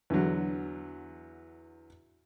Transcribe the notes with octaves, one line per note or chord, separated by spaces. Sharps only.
E2 D3 F#3